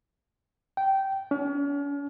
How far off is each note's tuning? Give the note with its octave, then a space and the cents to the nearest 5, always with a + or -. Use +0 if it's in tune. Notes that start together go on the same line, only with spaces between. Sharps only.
G5 -15
C#4 +45